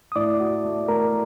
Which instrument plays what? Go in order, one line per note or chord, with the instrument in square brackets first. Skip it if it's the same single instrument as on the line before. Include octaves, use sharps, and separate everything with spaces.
[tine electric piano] D#6
[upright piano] A2 [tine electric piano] D5 D6
[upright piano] F#4
A3
[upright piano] A3 [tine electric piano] A#4 A#5